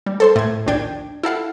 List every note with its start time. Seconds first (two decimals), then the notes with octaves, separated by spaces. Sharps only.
0.06 G3
0.20 A4 C5 C6
0.36 A2 G#6
0.66 A#1 D#2 D4 G5 G#6
1.23 E4 A4 F5 F#5